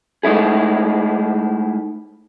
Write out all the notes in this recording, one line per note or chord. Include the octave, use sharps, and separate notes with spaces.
G#3 A3 D#4 E4 G#4